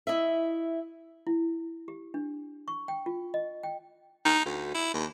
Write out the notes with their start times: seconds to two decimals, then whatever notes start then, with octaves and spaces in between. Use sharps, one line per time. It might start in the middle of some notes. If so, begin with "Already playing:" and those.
0.07 E4 D#5 E5
1.27 E4
1.88 G4
2.14 D4
2.68 C#6
2.88 G5
3.06 F4
3.34 D#5
3.63 G5
4.25 D#4
4.46 D2
4.75 E4
4.94 D#2